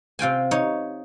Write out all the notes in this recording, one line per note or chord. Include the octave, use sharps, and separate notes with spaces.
C3 F4 G5 G#5
D#4 C#5